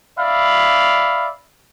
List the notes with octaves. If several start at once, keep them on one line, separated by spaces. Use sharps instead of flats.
D5 E5 F5 B5